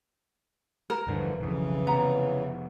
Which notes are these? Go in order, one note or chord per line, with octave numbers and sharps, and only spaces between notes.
A#4
E1 G2 D3 E3 F3
B1 F2 C#3 E3
F1 C3 B3 A#5